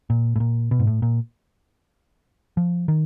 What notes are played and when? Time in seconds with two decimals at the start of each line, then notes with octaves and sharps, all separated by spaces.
0.10 A#2
0.36 A2
0.40 A#2
0.71 B2
0.79 G#2
0.87 A2
1.02 A#2
2.57 F3
2.88 D#3